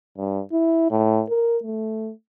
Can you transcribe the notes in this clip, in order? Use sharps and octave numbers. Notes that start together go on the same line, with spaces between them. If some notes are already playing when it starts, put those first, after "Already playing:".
G2
E4
A2
A#4
A3